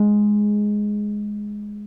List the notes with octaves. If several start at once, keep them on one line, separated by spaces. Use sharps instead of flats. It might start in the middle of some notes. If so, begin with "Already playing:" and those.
Already playing: G#3